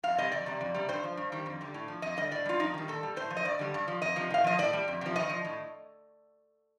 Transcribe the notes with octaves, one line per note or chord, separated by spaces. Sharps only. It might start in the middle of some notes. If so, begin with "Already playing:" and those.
F2 F5
C3 G3 D#5
F2 D5
C3 G3
F2
C3 G3
G2 C5
F3
G2
D#3 G3
F2
D3 G3
A2
F3
F2 D#5
D3 G3 D#5
A2 D5
G3 F4
F2 D#4
D#3 G3
A#2 A4
G3
A2 C5
F3
D#5
G2 D5
D3 G3
G2
F3
F2 D#5
C3 F3
A2 F5
F3 D#5
A2 D5
G3
F2
C3 F3
G2 D#5
F3
A2